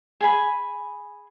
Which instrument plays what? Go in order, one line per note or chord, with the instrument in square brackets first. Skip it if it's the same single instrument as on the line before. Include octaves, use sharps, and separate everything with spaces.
[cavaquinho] G#4 G#5 B5